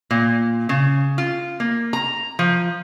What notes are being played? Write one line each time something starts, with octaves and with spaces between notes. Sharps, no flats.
A#2
C#3
F4
A#3
A#5
F3